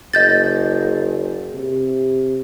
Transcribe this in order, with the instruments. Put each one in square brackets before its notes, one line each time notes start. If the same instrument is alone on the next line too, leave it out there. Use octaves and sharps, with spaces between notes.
[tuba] F#1 [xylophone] D#5 G6 A6
[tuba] C3